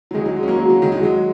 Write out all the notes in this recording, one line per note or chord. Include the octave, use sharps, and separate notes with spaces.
F#3
D#3 G#3
F#3
G#3
C#4
F#3 A#3
A#3
F#3
D#3 G#3
F#3
G#3